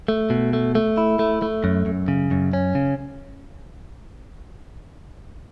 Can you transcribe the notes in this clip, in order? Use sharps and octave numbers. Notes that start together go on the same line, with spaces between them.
A3
B2
A3
A3
E4
A3
A3
F#2
F#2
C#3
F#2
C#4
C#3